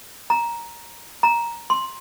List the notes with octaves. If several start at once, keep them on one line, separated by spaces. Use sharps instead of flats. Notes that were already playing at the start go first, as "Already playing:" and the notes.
A#5
A#5
C6